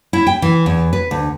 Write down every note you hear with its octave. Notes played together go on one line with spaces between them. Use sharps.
E4
G5
E3
E2
B4
D2